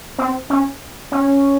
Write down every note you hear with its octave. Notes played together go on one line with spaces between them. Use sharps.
C4
C#4
C#4